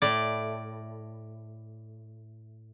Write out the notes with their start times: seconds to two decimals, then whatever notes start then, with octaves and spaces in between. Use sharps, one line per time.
0.02 A2 D5